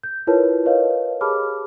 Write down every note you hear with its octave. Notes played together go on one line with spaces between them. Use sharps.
G6
E4 F4 A#4 B4 C#5 A5
A#4 B4 C#5 D#5 F5
G4 G#4 A5 B5 D6 F6